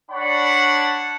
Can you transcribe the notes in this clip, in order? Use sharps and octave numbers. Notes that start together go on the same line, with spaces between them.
D4 C#5 D5 F#5 A5 B5